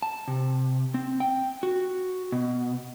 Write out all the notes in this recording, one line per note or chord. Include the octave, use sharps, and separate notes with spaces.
A5
C3
C4
G5
F#4
B2